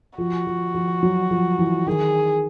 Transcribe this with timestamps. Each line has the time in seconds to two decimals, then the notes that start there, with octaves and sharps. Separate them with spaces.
0.18 F3 F#4
0.47 F3
0.74 F3
1.03 F#3
1.31 F3
1.59 E3
1.87 D#3 G#4